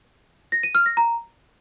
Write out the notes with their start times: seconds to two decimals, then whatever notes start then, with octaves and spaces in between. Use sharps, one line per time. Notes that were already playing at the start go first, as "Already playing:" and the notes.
0.52 A#6
0.63 D#7
0.75 F6
0.86 A#6
0.97 A#5